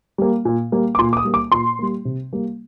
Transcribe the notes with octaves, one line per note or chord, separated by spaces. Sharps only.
G3 A#3
A#2
G3 A#3
D6
A#2 C6
D6
D#6
G3 A#3
D6
A#2 C6
G3 A#3
C3
G3 A#3